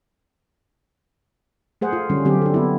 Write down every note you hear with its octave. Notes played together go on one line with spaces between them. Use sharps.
A3 G#4 C5 F#5
F4
D3 G3 C#4
D3 F#3 C4 F4 G4
D4 A4
B3 E4